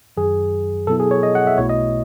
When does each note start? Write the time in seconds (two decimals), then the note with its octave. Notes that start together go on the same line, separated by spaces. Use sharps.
0.17 F#2 D#3 F#3 G#4
0.87 B2 F#3 B3 E4 A4
1.00 G#4
1.11 C#5
1.23 D#5
1.35 F#5
1.47 E5
1.58 B1 B2 A3 E4 C#5
1.69 D#5